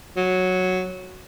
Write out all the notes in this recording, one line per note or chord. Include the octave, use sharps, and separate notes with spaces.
F#3